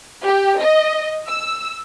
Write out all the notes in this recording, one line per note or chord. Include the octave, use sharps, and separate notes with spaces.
G4
D#5
E6